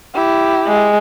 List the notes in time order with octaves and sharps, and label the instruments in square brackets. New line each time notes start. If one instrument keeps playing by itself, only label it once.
[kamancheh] E4 G4
[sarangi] G#3